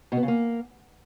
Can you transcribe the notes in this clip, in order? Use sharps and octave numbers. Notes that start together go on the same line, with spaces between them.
B2
B3
C#3
A#3